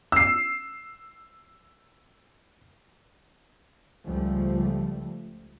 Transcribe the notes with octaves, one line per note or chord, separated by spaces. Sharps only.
E6 C7
C#2 F3 G3 A3